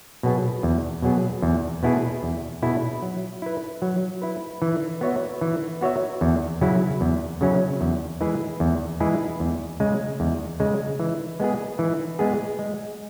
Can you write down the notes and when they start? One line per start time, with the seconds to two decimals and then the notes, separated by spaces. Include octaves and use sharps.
0.23 B2 F#3 B3 G#4
0.63 E2
1.02 B2 F#3 B3 G#4
1.42 E2
1.83 B2 B3 E4 G#4
2.23 E2
2.62 B2 B3 E4 G#4
3.02 F#3
3.42 E4 B4
3.82 F#3
4.22 E4 B4
4.62 E3
5.01 B3 F#4 C#5 E5
5.41 E3
5.81 B3 F#4 C#5 E5
6.21 E2
6.61 C#3 F#3 C#4 E4
7.01 E2
7.41 C#3 F#3 C#4 E4
7.81 E2
8.21 E3 G#3 E4 G#4
8.60 E2
9.00 E3 G#3 E4 G#4
9.40 E2
9.80 C#3 G#3
10.20 E2
10.60 C#3 G#3
11.00 E3
11.40 G#3 B3 G#4
11.79 E3
12.19 G#3 B3 G#4
12.59 G#3